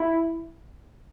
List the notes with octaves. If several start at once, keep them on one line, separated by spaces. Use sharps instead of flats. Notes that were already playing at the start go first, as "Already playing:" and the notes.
Already playing: E4